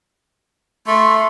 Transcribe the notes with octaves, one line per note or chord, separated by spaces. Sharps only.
A3 C6